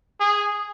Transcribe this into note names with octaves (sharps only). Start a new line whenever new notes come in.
G#4